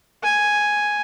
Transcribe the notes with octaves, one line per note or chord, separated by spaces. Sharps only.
G#5